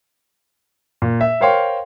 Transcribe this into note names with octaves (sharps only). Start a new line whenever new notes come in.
A#2
E5
A#4 C5 C#5 F5 G5 C6